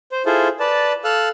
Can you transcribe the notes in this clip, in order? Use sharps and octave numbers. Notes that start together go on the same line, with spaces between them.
C5
E4 F4 G#4 A4 C5
B4 D5 A5
A4 F5 E6 F#6